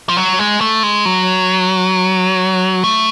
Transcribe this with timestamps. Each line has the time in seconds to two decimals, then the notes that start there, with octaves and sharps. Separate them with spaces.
0.09 F3
0.17 F#3
0.39 G#3
0.61 A3
0.83 G#3
1.05 F#3
2.84 A3